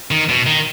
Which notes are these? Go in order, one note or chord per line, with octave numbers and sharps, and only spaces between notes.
D#3
B2
D#3